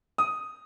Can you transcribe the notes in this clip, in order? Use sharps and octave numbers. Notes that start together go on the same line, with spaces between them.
D#6